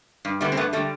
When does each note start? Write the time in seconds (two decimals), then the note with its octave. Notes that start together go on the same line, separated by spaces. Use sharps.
0.25 G2
0.41 D3 G3 A3 B3
0.52 C4
0.57 G2 A3 B3
0.73 D3 G3 A3